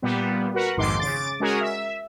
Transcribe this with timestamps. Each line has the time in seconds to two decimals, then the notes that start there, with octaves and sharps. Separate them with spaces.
0.02 A#2 G3 B3
0.54 F#4 A#4 B4 F#5
0.77 A#1 F2 G#2 D#3 C6 D6
1.00 C#3 D6 A6
1.40 G#3 C#4 F#4 G#4 A#4
1.61 E5